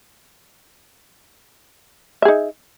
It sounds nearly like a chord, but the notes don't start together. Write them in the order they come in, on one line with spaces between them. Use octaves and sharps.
E5 G#4 D#4